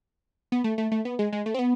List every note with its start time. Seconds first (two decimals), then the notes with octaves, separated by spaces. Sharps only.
0.52 B3
0.64 A3
0.78 A3
0.92 A3
1.05 B3
1.19 G#3
1.33 G#3
1.46 A3
1.54 C4
1.59 B3